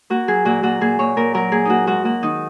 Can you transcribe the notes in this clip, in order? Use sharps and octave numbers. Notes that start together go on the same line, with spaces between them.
A#3 F#4
F#3 G#4
A#2 F#4
A#2 F#4
A#2 G#4
A#2 C#5
A#2 A#4
F#3 A#4
A#3 G#4
A#3 D#4 F#4
G#2 F#4
A#3 F#4
D#3 D#4